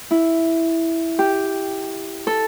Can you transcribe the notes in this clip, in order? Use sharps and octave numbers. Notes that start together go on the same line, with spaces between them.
E4
G4
A4